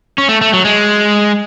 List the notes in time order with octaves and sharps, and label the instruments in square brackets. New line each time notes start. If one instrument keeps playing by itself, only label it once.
[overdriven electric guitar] C#4
A3
A3
F#3
G#3